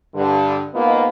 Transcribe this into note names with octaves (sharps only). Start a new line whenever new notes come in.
G2 D3
G#2 A#3 B3 F4 D#5